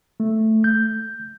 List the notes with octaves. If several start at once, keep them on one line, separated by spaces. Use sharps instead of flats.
A3
G6